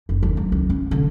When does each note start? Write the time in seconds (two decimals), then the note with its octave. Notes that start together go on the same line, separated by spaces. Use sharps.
0.09 F#1
0.23 D#2
0.37 F#3
0.52 C#2
0.70 C#4
0.91 D3